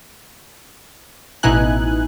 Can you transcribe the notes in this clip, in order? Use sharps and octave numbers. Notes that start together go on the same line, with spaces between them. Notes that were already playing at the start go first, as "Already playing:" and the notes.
A1 B2 D#4 E4 G#5 F#6